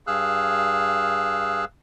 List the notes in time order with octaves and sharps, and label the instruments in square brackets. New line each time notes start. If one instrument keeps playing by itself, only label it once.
[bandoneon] G2 G#4 F5 E6 F#6